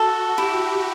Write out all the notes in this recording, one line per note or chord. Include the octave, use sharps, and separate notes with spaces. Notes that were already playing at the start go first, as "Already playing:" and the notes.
Already playing: F#4 A4
E4 G4